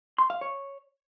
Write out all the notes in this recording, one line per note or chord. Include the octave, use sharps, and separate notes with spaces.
C6
F5
C#5